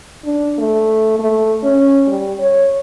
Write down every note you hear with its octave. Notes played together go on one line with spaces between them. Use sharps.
D4
A3
A3
C#4
G3
C#5